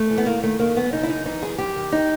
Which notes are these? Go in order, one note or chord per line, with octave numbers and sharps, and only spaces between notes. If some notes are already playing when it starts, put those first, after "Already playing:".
Already playing: A3
E3
B3
D#3 A#3
D#3 A3
D#3 A#3
F#2 B3
C#3 D#4
E4
F#2 D#4
E3 D#4
F#2 G#4
F#2 G4
D#3
D#4